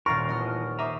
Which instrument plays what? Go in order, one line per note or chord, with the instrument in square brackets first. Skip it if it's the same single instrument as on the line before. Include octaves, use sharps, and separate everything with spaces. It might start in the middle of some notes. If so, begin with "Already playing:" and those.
[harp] D#1 A6 A#6 [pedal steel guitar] A#4 F5 [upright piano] C#6
[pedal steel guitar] E3 F3 B3 [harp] D#5 F6
[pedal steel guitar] C5 D#5 A#5 [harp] E5 D6